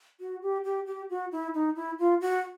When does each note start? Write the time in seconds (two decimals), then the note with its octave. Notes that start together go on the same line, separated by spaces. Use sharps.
0.20 F#4
0.42 G4
0.64 G4
0.86 G4
1.10 F#4
1.32 E4
1.55 D#4
1.76 E4
1.99 F4
2.21 F#4